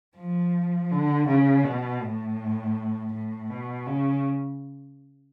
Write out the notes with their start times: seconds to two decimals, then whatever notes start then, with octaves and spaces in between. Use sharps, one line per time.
0.17 F3
0.91 D3
1.27 C#3
1.64 B2
2.01 A2
3.13 A2
3.50 B2
3.87 C#3